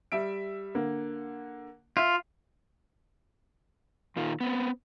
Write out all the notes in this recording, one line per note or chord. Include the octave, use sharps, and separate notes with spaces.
G3 E5 D7
D3 A#3
F4 E5
A#2 D#3 F4
B3 C4